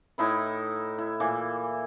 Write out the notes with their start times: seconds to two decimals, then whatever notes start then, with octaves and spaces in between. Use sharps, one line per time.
0.18 A2 D#4 E4 B4
0.98 E4
1.20 A#2 E3 D6